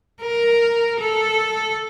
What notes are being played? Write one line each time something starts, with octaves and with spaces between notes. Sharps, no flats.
A#4
A4